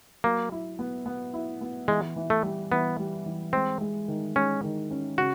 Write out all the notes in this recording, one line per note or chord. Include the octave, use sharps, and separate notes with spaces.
F#3 A#3
E4
B3
B3
E4
B3
E3 G#3
E3
A3
G3
E3 B3
G3
E3
G#3 C4
G#3
D#3
G#3 C#4
D#3
C#4
C#3 F#4